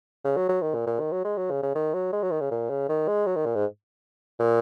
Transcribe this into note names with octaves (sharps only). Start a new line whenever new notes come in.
C#3
F#3
F#3
D#3
A#2
A#2
D#3
F#3
G#3
F#3
C#3
C#3
D#3
F#3
G#3
F#3
D#3
C#3
A#2
C#3
D#3
G#3
F#3
D#3
A#2
G#2
A#2